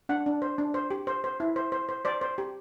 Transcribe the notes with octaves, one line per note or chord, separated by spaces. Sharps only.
D4 F#5
D4
C5
D4
C5
G4
C5
C5
E4
C5
C5
C5
C5 D5
C5
G4